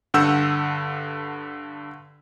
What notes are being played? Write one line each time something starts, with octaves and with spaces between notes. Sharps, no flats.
G2 D3 F#5 E6 G6